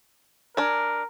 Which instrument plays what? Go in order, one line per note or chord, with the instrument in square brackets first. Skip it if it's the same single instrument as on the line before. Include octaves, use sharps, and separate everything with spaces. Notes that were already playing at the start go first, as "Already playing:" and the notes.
[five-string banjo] D4 G#5 [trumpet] A#4